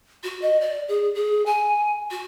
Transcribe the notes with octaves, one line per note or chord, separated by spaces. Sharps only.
F#4
D#5
D5
G#4
G#4
G#5
F#4